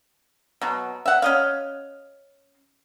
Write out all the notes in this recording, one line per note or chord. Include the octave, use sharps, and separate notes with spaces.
B2 F#3
E5 F#5
C#4 D#5 F5